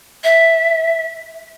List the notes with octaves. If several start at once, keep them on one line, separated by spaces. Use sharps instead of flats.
E5